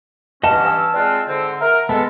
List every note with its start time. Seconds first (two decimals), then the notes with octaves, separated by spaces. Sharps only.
0.43 G2 E3 C#4 D#5 F#5 A5
0.65 B4 G#5 A5 E6
0.94 G#3 C4 F4 D5 F#6
1.27 G#2 D3 C4
1.61 A#4 E5 F#5 A#5
1.89 G#3 B3 A4 A5